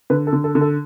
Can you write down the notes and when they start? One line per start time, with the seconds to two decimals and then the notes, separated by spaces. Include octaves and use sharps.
0.10 D3 B4
0.27 A4
0.33 D3
0.44 A4
0.55 D3
0.61 A4